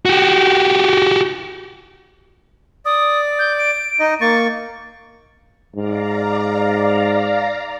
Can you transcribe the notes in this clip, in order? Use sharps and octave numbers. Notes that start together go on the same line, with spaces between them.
F#4 G4
D5 D#6
G6
D7
D#4 D#5
A#3 C#6 A6
G#2 D5 F5 A#5